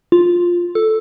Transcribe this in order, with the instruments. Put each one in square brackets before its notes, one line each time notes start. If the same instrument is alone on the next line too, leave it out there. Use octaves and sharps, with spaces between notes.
[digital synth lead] F4
A4